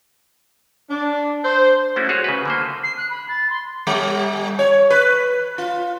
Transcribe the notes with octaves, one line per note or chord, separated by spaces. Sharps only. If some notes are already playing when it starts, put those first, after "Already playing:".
D4
C5
A3 C#4 D4 E4 F#4
F#4 G#4 C#5
C#3 B4
D3 A#3 C5
C7
F#6
B5
A6
C6
G3
C#5
B4
F4